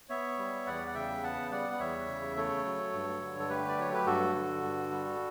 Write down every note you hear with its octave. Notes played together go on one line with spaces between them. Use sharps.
B3 C#5 E5
G3
E2 D5 F#5
F#5
C#3 E5 G5
B3 F#5 A5
G3 D5 F#5
D5
E2 C#5 E5
C#3
A3 A4 C#5
F#3
G2
D3
A4
A3 G4 B4
D5
F#3 C#5
B4
G2 F#4 A4
D3
G2
G3